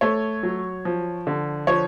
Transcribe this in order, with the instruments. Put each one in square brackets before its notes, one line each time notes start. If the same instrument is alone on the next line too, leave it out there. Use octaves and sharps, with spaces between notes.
[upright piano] A3 C#5
F#3
F3
D3
F3 C#5